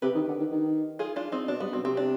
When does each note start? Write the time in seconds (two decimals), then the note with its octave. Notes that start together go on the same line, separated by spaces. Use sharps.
0.02 C3 G4 B4
0.15 D#3
0.28 D3
0.39 D#3
0.51 D#3
0.99 F4 G#4
1.16 D4 F4
1.32 C4 D#4
1.48 B2 D4
1.60 G2 B3
1.73 B2 C4
1.85 C3 C4
1.97 D4